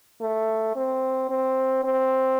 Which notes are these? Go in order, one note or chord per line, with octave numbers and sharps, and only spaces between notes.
A3
C4
C4
C4